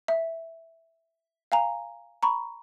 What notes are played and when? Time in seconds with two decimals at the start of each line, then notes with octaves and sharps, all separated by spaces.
0.08 E5
1.52 F5 G#5 A#5
2.23 A#5 B5 C#6